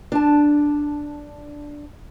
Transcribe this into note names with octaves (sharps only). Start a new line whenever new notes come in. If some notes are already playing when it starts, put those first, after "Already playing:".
D4 A5